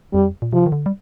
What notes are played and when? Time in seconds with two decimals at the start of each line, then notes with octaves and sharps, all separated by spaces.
0.13 F2 G3
0.42 A#2
0.53 C3 F3
0.66 D#3
0.72 D3
0.86 G3